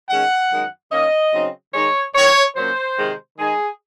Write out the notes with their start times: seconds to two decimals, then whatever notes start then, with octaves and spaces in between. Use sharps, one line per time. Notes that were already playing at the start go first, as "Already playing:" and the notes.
0.09 D#3 G#3 C#4 F#5
0.50 F#2 D#3 G#3
0.90 D#3 A#3 C#4 D#5
1.32 C#3 F#3 C4 D#4
1.73 D#3 G#3 D#4 C#5
2.14 F#2 D#3 F#3 C#5
2.55 A#2 F#3 A#3 C#4 C5
2.97 C3 D#3 G#3
3.38 D#3 G#3 D#4 G#4